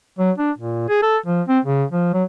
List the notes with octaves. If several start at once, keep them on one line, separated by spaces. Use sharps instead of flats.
F#3
D4
A#2
G#4
A4
F3
C4
C#3
F3
F#3